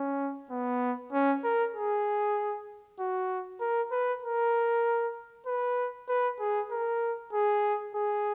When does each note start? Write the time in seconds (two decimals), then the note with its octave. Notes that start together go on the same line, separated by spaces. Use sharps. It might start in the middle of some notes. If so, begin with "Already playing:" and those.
Already playing: C#4
0.50 B3
1.12 C#4
1.44 A#4
1.75 G#4
2.99 F#4
3.60 A#4
3.92 B4
4.23 A#4
5.46 B4
6.08 B4
6.40 G#4
6.71 A#4
7.33 G#4
7.94 G#4